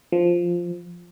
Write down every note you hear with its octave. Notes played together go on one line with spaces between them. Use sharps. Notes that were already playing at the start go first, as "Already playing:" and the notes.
F3